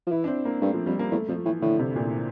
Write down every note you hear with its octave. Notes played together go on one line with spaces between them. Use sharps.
F3
E3 E4
D4
C4
A#3
G2 A3
F3
F2 G3
A#3
E2 A3
F2 F3
A2 E3
A2 D3
C3
A2
A#2